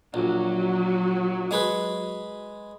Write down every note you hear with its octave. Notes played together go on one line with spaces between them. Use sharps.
A#1 F#3 F#4
G#3 G#4 B4